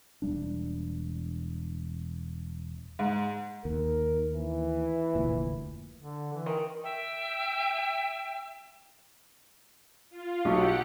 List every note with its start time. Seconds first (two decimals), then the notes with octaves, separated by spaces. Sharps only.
0.22 E1 G3 D4
2.99 G#2
3.65 D#2 A#4
4.34 E3
5.15 F1 D2 A#2
5.97 D3
6.33 E3
6.46 D#3
6.84 E5 G5
10.10 F4
10.45 B1 F#3 G4 F#5 C#6 C#7